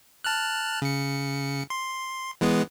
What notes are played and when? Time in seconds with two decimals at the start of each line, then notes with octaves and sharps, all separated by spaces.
0.24 A5 F6 F#6
0.82 C#3 C#7
1.70 C6
2.41 E3 G#3 B3